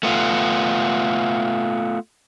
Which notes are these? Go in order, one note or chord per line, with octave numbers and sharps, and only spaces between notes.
A3 B3 F4